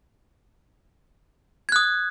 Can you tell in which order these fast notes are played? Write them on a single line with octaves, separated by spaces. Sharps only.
G#6 F#6 D#6